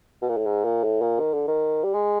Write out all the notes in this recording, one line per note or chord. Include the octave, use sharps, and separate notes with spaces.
B2
A#2
A2
G#2
A#2
A2
A#2
D#3
D3
D#3
G3
G#3